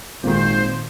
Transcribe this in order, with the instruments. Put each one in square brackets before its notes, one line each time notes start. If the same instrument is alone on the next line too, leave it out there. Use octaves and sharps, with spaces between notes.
[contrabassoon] G#1 [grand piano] A#2 D#3 [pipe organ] C5